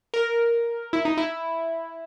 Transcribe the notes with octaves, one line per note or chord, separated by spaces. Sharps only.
A#4
E4
D#4
E4